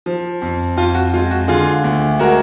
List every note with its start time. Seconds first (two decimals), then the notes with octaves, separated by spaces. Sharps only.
0.06 F3
0.42 F2
0.77 F2 F4
0.94 F#4
1.13 G#3 F4
1.31 F#4
1.48 D3 F4 G#4
1.84 D2
2.19 G#3 F#4 A#4